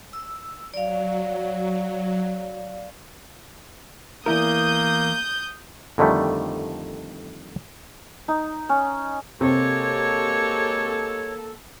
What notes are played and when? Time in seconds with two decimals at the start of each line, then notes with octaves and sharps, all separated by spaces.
0.13 E6
0.74 F#3 D5 F5
4.26 E2 A#3 E4 A#4 D#6 G6
5.98 F2 D3 D#3 G3 A3
8.28 D#4
8.69 C#4
9.41 C3 G#3 A#3 G4 A4 C#5